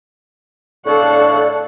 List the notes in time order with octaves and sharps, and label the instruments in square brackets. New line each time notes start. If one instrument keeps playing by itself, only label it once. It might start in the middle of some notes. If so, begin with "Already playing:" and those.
[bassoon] A2 [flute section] D4 F5 C#6 [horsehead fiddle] A4 F#5 [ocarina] D5